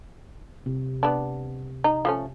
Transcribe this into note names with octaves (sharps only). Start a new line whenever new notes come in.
C3
B3 D4
D#4
F3 A3 C#4